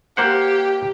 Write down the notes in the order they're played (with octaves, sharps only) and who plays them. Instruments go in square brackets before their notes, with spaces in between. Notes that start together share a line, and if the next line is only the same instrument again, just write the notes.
[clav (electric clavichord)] A#3 C5 F#5 [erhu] G4